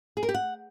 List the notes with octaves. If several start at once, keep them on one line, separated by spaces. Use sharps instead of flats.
G#4
A#4
G4
F#5